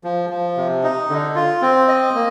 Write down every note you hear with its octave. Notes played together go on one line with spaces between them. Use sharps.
F3
F3
C3
D#4
D3
F4
C4
D#5
A#3